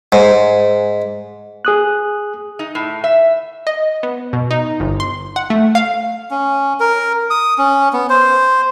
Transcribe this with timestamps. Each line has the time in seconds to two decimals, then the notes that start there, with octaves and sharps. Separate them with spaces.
0.12 G#2
1.65 G#4 D#6 F#6
2.59 D#4
2.75 A2
3.04 E5
3.67 D#5
4.03 B3
4.33 B2
4.51 D#4
4.80 G1
5.00 C6
5.36 F#5
5.50 A3
5.75 F5
6.31 C#4
6.80 A#4
7.30 D#6
7.58 C#4
7.93 B3
8.09 C5